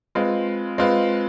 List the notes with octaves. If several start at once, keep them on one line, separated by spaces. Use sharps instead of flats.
G#3 C4 F4 B4
G#3 C4 F4 B4